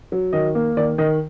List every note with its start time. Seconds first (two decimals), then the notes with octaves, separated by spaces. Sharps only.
0.12 F#3
0.33 D#3 D#5
0.55 A#3
0.77 D#3 D5
0.98 D#3 D#5